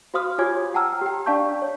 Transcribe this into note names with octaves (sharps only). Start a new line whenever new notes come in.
F#4 C5 F5 C6 D#6 F6
F4 G4 C#5 G#5 D6 G#6
F#5 G5 A5 A#5 E6 F6
G4 G5
D4 D5 F5 A5 C#6 G6
C#5